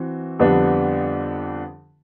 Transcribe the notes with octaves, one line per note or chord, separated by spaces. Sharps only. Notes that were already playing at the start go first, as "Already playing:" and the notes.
Already playing: E3 C4 F#4
F2 D3 G3 B3 D4